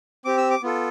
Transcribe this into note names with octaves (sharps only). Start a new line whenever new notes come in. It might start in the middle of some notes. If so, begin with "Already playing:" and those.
C4 G4 D6
E6
D6
B3 F4 A4